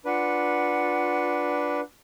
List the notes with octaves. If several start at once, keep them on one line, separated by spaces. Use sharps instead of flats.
D4 F4 B4 F#5